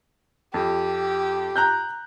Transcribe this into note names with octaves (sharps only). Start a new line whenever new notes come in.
F2 G4
A#5 F#6 G6